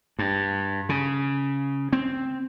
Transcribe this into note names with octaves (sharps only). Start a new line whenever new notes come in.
G2
C#3
C4